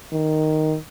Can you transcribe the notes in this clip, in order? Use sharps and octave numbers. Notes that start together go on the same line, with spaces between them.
D#3